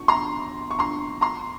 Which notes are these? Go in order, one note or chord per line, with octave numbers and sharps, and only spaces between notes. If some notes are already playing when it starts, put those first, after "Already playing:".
Already playing: C#6
A#5 C6
C#6
A#5 C6
A#5 C6